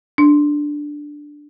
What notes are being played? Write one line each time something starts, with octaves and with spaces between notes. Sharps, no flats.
D4